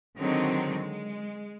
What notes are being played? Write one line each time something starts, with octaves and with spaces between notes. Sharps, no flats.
D3 D#3 F#3 G#3 C4 D#4
G#3